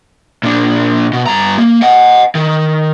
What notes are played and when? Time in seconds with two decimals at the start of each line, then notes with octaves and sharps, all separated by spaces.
0.43 A#2 D4
1.13 B2
1.26 G2 A#5
1.58 A#3
1.82 D#5 F#5
2.35 D#3